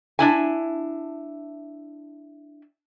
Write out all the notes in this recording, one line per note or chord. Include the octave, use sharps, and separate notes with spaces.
D4 E4 G#5